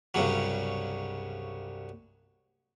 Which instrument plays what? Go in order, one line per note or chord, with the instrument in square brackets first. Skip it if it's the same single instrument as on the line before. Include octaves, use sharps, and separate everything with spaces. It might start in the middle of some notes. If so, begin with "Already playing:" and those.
[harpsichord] C2 G2 C#3 F#3